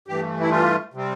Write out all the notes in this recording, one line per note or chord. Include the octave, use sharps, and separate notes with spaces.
G2 E3 A3 G4
E4
F4
C3 G3 C4